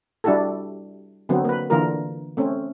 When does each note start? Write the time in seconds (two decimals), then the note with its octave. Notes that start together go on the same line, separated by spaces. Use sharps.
0.24 G3 D4 E4 F#4 G4 A4
1.29 D3 F#3 B3 C4
1.45 A#3 B4
1.70 D3 E3 A#3 F4 A#4
2.37 A3 C4 C#4